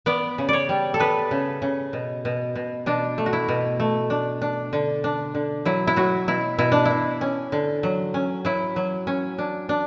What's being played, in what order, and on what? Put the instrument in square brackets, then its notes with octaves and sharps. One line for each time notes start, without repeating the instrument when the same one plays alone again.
[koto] B3 D5
C#3
C#5 D5
G3
A4
B3 B4
C#3
C#3
B2
B2
B2
B2 D4
A3
F#4
E4
B2
A3
D4
D4
D3
D4
D3
F#3 E4
E4
F#3 F#4
B2 E4
B2 E4
D4
E4
B2
C#4
D3
F#3
C#4
F#3 E4
F#3
C#4
D4
D4